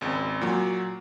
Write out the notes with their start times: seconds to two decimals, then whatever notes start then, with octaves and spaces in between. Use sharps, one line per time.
0.01 G#1 C#2
0.41 A#2 F#3